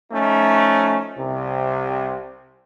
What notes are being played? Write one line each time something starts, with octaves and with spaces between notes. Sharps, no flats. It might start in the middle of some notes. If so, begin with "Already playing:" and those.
F3 A3 C#4 D#4
C2 C3